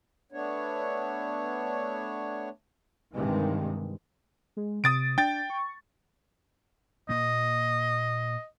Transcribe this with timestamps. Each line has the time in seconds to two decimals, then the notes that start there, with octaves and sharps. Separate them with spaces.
0.32 A3 B3 D4 C#5
3.13 G2 C3 D#3 E3 G#3
4.57 G#3
4.84 C3 D#6 A6 D7
5.18 D4 G5 A6
5.50 C#6
7.09 A#2 A#3 D#5